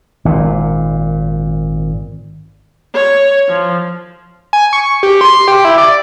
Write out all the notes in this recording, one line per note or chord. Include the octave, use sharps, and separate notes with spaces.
G#1 A#2
C#5
F3
G#5
C#6
G4
C6
G4
E4
D5